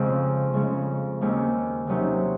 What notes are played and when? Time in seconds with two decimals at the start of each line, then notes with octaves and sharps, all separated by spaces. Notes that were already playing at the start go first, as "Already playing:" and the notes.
Already playing: F2 C#3 G#3 C4
0.54 C#3 G#3 C#4
1.21 D#2 D#3 G#3 C4 C#4
1.87 C3 D#3 F#3 C#4 D#4